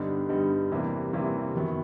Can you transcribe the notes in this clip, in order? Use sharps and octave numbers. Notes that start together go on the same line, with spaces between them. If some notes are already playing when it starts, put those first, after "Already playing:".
Already playing: G2 D3 G3 B3 D#4
G2 D3 G3 B3 D#4
E2 C3 E3 G3 A#3
E2 C3 E3 G3 A#3
F#2 D#3 F#3 B3